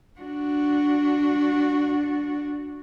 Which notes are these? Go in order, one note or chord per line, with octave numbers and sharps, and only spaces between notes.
D4 F#4